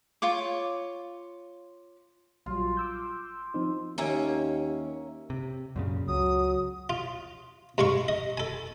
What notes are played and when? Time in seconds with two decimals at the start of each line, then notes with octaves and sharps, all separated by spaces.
0.22 F4 C#5 D6
2.46 A#1 F#3 G3 F4
2.77 D6 E6 G6
3.54 F3 C4 D#4
3.98 D#2 A#3 C#4 E5
5.30 C3
5.76 F#2 A#2 C#3
6.08 C#2 F#3 D#6
6.90 F4
7.78 G2 G#3 F5 C#6
8.08 D#5
8.37 A4 G#5